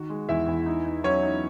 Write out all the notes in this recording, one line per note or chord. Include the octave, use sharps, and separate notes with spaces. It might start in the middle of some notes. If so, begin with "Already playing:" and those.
Already playing: D#3 F#4
G#3
E2 E4 E5
E2
D#4
D#4
F#3 C#4 C#5
D#4